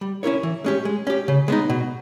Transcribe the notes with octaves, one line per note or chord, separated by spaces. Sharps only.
G3
C#4 E4 A#4 C#5
E3
G#3 C#4 G4
G#3
C#4 G4
C#3
G#3 B3 D#4
B2